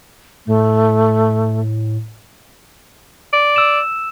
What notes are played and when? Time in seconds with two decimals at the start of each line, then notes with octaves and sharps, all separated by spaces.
0.47 A2 A3
3.33 D5
3.56 E6 E7